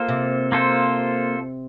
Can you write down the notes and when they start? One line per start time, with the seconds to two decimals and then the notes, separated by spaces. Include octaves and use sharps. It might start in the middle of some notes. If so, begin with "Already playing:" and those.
Already playing: A#3 F4 A4 C5
0.09 C3
0.52 A#3 F4 A4 C5